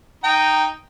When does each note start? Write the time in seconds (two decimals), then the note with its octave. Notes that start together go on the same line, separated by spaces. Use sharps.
0.24 D#4 G5 A#5